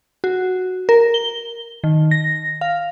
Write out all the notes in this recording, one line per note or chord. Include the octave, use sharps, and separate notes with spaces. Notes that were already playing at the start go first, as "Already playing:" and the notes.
F#4
A#4
G7
D#3
A#6
F5